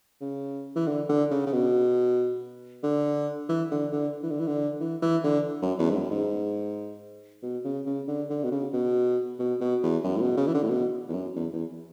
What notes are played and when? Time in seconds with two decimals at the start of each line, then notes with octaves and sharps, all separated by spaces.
0.21 C#3
0.76 E3
0.87 D3
1.09 D3
1.31 C#3
1.46 C#3
1.53 B2
2.83 D3
3.49 E3
3.71 D3
3.92 D3
4.23 E3
4.31 D3
4.39 E3
4.47 D3
4.80 E3
5.02 E3
5.24 D3
5.62 F#2
5.79 E2
5.91 G#2
5.95 F#2
6.11 G#2
7.42 B2
7.65 C#3
7.86 C#3
8.08 D3
8.30 D3
8.44 B2
8.52 C#3
8.73 B2
9.39 B2
9.61 B2
9.83 E2
10.04 F#2
10.17 A2
10.22 B2
10.37 C#3
10.47 E3
10.54 D3
10.63 A2
10.70 B2
11.09 E2
11.14 F#2
11.36 E2
11.53 E2